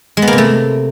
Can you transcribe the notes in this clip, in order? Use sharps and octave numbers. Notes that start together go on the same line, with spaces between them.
G#3
B3
A#3
C3
A3